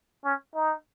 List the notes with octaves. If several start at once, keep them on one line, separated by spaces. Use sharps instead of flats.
C#4
D#4